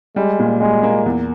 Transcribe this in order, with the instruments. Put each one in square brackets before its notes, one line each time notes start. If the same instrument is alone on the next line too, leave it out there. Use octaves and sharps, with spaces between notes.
[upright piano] G3 [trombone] G#3
[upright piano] A#2
[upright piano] G3 [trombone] G#3
[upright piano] A#3
E2